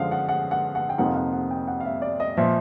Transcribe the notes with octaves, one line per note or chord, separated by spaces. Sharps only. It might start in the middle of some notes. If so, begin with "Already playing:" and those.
Already playing: F#2 D3 F3 G#3 F5 F#5
F#5
F#5
F#5
F#5
G5
F2 C3 F3 A#3 D#4 F#5
F5
F#5
F#5
G5
F#5
F5
E5
D5
D#5
A#2 F3 E5